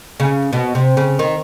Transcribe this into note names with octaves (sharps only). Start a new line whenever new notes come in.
C#3
B2
C3
C#3
D#3